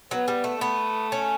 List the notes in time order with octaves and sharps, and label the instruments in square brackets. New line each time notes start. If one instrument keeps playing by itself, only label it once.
[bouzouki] F#3 [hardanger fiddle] B3
[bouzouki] G3
A3
[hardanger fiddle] A3 [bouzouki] B3
[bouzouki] C#4